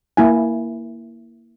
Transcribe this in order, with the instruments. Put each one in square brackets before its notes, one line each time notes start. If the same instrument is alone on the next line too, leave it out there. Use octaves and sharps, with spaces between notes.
[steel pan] A#3 E4 G#5